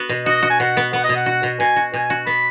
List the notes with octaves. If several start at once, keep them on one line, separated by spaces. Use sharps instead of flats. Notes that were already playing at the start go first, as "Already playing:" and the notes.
Already playing: B3 F#4
B2
F#4 D#5
F#4
G#5
B2 F#5
B3
B3 F#5
D#5
B2
F#5
F#4
B2
B2 G#5
F#4
B2 G#5
F#4
B3 B5